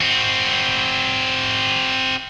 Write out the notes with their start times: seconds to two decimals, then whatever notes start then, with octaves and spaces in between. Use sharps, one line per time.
0.01 C4 F#4